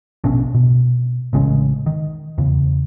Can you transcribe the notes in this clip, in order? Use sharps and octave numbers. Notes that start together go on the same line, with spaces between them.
A#1 B2 C#4 D4
B2
A1 C#3 G#3 C#4
D#3
E2 C#3